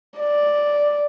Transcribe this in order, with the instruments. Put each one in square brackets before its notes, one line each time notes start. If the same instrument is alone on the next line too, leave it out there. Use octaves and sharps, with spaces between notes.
[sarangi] D5